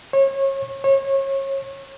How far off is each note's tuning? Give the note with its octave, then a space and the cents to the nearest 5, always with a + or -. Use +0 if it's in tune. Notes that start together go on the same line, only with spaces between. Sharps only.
C#5 -30
C#5 -30